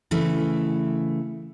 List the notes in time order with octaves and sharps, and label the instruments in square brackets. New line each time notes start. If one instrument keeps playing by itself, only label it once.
[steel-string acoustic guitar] C#3 E3 A3